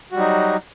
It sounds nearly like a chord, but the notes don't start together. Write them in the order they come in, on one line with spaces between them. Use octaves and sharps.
F#4 G3 F#3 D#4